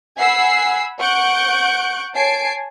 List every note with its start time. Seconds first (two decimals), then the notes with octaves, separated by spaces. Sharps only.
0.17 F#5 G#5 B5 E6 C7
1.00 F#5 C#6 F#6 G6 D7
2.15 C#5 G#5 A5 C7 D7